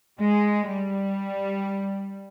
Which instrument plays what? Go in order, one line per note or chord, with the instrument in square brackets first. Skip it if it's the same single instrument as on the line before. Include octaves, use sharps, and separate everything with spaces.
[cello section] G#3
G3